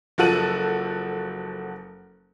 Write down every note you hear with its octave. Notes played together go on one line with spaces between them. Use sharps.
F#1 F3 F#4 A4 D#7 F#7